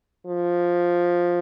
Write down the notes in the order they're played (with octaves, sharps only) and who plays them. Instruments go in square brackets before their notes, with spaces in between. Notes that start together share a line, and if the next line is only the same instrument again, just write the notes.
[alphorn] F3